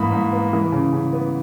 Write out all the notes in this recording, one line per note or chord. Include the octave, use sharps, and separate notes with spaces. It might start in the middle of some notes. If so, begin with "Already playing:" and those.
Already playing: G#2 E3 A#3 B5
G#2
B3
E3
C#3
C#3
B3